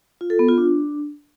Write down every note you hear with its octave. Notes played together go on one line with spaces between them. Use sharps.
F4
A4
B3
F4
D4